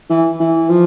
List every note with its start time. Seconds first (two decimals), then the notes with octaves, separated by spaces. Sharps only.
0.10 E3
0.40 E3
0.70 F3